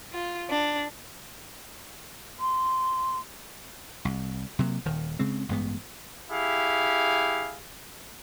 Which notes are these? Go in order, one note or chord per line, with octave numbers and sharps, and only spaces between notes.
F4
D4
C6
C2
C3 F#3 A3 A#3
D#1 D#3
C#3 G#3 C4
A1 G2 G#3 B3
E4 G4 G#4 F5